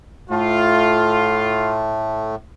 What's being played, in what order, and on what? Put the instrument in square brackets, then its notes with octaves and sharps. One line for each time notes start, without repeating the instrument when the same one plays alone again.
[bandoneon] A2 A3 [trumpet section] F4